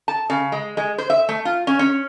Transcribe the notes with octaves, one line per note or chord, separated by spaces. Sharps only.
A5
C#3
G#3
G#3
C5
E5
A3
F4
C#4
C#4